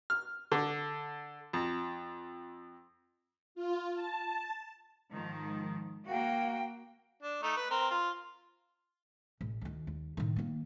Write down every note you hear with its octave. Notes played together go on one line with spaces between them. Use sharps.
F6
D3
F2
F4
A5
G#2 D#3 F3
A#3 F#4 F5 G5
D4
A3 D#4
B4
C4 A#4
F4
A1
D2 D#3
D#2
A2 D#3
D#3 A#3